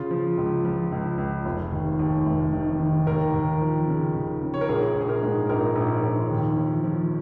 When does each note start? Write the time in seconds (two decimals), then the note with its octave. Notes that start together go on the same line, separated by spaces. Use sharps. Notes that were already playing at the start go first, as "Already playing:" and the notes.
Already playing: C#3 F4
0.11 F3
0.38 C#2
0.65 F3
0.92 C#2
1.18 C#2
1.45 F1
1.72 D#2
1.99 D#2
2.26 F1
2.53 D#3
2.80 D#3
3.07 D#2 A#4
3.34 D#2
3.61 F3
3.88 C#3
4.15 D#2
4.42 C#3
4.54 C#5
4.61 A#4
4.69 A#1 G#4
4.95 A#1
5.01 G#4
5.09 A#4
5.23 G#2
5.49 A#1 A#4
5.76 A#1
6.03 A#1
6.30 D#2
6.57 F3
6.84 F3